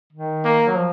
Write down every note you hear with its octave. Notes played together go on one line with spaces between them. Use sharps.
D#3
A#3
F#3
F3